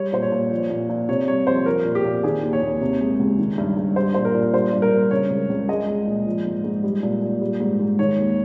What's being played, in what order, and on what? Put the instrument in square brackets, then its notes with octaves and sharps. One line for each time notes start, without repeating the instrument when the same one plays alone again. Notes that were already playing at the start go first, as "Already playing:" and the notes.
Already playing: [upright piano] G3 C#5
A#2 C5
C#5
A#2
F3
A#2
A#2
C3 C#5
G3 C#5
F2 C5
F3 A#4
A#2
G4
A#2
D#3 G#4
D#2
C#5
D#2
C3
G#3
C#2
D#3
G2
G2
G3 C5
A#2 C5
A#4
A#2
G3 C5
G2
A#4
G2
C#3 C#5
C#2
C#2
G#3 D#5
G#3
A#2
F3
G#2
G#2
G3
A#2
A#2
G3
G#2
G#2
D#3 C#5
D#2